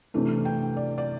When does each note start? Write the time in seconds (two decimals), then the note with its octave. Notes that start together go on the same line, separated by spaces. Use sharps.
0.14 C3 E3 A3 D4
0.45 G5
0.77 D5
0.98 D5